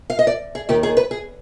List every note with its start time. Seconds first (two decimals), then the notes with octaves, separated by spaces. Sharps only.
0.10 F5
0.19 D#5
0.27 D5
0.55 G#4
0.69 D#2 D#3 G4
0.83 G#4
0.97 B4
1.11 G#4